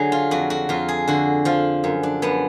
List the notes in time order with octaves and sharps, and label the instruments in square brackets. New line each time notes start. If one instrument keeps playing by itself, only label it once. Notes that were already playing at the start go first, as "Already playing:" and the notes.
Already playing: [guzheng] D3 F#3 G#4
F4
F2 F#4
F#4
F2 F4
G#4
D3 F#4
F3 F4
F#2
D4
F#2 B3